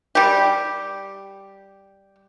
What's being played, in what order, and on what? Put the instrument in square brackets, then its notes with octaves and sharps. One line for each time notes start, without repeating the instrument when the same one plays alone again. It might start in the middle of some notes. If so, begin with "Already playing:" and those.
[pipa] G3 G4